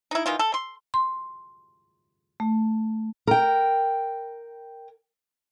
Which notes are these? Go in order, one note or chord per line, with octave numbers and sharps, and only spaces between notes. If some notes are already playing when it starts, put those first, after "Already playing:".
D#4 E4
D#3 E3 F4
A4
C6
C6
A3
A#4 G5